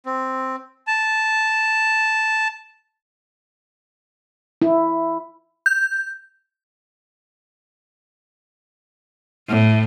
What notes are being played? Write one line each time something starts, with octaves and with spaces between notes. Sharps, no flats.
C4
A5
E4
G6
A2